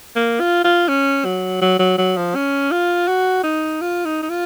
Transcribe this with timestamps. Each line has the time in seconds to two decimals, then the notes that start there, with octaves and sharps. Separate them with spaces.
0.16 A#3
0.40 F4
0.64 F4
0.88 C#4
1.25 F#3
1.62 F#3
1.79 F#3
1.98 F#3
2.17 F3
2.35 C#4
2.71 F4
3.08 F#4
3.44 D#4
3.81 F4
4.06 D#4
4.23 D#4
4.30 F4